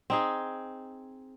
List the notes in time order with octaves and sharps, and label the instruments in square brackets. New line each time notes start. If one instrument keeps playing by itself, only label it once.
[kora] C4 D#4 G#4